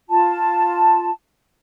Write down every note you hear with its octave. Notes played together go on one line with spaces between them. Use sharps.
F4 A5